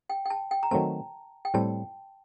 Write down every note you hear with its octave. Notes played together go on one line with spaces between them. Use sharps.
G5
G5
A5
G5
A#5
D#3 F#3 A3 C4 A5
G5
A2 G3 C4 A5